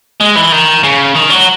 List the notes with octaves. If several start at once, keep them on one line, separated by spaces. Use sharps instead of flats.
G#3
E3
D#3
C#3
D#3
F#3